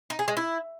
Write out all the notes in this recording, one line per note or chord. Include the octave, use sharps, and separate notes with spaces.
D#4
G#4
G#3
E4